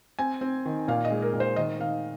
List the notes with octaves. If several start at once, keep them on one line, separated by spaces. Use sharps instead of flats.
C4 G#5
C4
D#3
A#2 F5
D#5
G#3
A#4
A#2
C5
D#3 D#5
D#3 F5